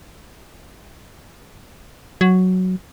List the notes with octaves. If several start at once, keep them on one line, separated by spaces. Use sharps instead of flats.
F#3